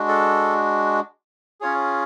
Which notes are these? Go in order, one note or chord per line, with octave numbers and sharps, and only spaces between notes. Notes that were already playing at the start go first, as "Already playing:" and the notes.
Already playing: G#3 D4 F#4
A4
C#4 F4 G#4 C#5